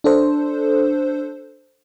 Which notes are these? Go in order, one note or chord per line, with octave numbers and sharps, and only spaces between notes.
D4 A4 C5